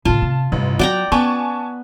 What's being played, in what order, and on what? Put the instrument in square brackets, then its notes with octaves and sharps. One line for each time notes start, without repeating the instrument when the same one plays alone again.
[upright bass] A2 C#3 [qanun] F4 [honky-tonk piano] A5
[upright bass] C3
[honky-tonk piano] A1 [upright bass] G2 C3
[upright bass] F#3 [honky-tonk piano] F#4 [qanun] D5 G5 A#5
[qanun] B3 [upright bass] C#4 [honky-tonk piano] G#5 A5 C#6